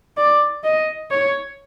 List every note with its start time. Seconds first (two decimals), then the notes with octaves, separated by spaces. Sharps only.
0.17 D5
0.64 D#5
1.11 C#5